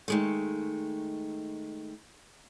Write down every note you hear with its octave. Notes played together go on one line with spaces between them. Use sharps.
D#3 G#3 A3